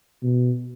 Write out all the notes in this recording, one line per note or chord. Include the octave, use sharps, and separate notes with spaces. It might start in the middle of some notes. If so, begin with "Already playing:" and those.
B2